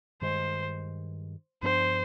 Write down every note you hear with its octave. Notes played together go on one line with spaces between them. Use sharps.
G2 D#3 G#3 C5
G2 F3 B3 D4 C5